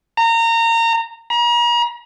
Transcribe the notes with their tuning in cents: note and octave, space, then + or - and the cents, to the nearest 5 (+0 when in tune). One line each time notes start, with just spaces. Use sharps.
A#5 -25
A#5 +40